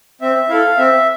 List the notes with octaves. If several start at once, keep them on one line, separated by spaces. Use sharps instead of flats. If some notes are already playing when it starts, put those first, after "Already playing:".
C4 E5
E4 A4 F5
C4 E5